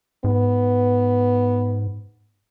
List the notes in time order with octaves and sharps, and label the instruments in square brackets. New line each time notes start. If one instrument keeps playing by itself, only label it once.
[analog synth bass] G#2 [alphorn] B3